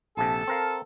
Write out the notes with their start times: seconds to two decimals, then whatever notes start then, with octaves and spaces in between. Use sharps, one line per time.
0.17 A#1 C3 A4 A5
0.48 C4 A#4 F5